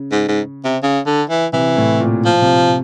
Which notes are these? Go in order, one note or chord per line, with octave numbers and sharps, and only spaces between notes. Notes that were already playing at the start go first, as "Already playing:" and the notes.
Already playing: C#3
G#2
G#2
C3
C#3
D3
E3
C3 E3
A2
A#2
F3
C3